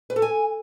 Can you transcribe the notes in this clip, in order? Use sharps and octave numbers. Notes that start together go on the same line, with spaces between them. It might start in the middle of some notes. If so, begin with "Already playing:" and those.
B4
A4
G#5